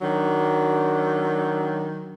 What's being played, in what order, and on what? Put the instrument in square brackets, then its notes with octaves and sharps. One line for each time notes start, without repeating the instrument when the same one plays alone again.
[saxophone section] D#3 F#3 D4